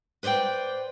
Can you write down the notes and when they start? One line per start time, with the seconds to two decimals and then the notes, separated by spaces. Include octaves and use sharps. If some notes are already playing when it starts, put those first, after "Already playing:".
0.23 B4 C5 D5 E5 G5